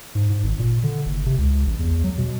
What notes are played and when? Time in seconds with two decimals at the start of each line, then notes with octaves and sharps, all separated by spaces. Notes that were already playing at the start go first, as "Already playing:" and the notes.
0.15 G#2
0.30 G#2
0.43 G#1
0.59 A#2
0.84 D3
1.06 F#1
1.26 C3
1.38 C#2
1.66 A1
1.79 E2
2.04 F#3
2.18 B2